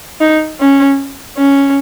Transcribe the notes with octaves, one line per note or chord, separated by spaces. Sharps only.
D#4
C#4
C#4